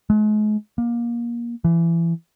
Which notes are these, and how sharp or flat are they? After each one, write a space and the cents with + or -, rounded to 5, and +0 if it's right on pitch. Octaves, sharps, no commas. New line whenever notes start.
G#3 +40
A#3 +25
E3 +25